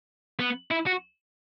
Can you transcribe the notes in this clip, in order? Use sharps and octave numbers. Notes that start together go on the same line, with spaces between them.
B3
E4
F#4